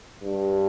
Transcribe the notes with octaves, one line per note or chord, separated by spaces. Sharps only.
G2